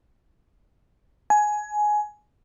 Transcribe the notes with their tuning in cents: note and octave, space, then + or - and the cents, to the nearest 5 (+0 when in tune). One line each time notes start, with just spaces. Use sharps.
G#5 +15